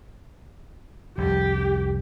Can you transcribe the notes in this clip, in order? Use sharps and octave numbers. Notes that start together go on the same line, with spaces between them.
C2 F2 G3 G4